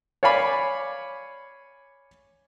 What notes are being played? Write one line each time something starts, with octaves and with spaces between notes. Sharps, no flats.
C#5 D5 F5 G#5 B5 D6